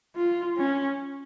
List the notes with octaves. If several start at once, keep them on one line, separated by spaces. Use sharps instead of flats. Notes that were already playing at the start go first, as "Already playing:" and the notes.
F4
C#4